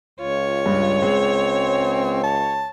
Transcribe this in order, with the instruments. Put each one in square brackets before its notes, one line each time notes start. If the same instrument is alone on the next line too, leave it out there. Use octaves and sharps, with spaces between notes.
[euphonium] C#2 [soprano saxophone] F4 [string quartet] C#5
[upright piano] G2
[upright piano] G#3 [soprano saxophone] C4
[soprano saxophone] A5